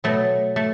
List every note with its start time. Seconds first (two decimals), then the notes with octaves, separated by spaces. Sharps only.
0.04 B2 F#3 A3
0.56 A3